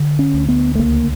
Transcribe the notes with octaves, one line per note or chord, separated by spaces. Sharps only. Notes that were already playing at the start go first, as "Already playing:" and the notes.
Already playing: D3
C#4
D2
B3
A3
C#2 A#3